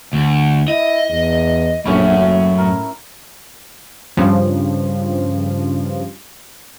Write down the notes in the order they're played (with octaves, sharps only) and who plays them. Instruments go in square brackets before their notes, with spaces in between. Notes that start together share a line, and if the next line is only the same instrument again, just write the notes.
[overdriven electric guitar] D2
[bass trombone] E4 [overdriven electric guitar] D#5
[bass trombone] E2
[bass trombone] A#1 [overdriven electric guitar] F#2 [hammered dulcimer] A2 C#4 E4
[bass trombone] F#1
[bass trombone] A2 [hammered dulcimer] A#4
[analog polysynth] G2 C#3 F3